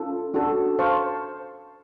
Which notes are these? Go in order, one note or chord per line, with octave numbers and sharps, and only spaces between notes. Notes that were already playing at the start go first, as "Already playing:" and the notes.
Already playing: C#4 F4 A4
D4 F#4 A4
C5 F5 A5 C#6